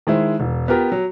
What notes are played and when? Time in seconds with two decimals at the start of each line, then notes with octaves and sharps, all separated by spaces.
0.07 D#3 G#3 E4 C5
0.40 E1
0.68 B3 F4 G4 A#4
0.92 F#3